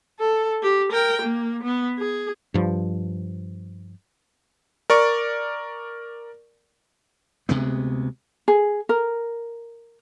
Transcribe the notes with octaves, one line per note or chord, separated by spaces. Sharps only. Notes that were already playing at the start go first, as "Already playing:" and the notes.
A4
G4
A#4 G5
A#3
B3
G#4
G2 F3
A#4 D5 C#6
D2 C3 G#3 B3
G#4
A#4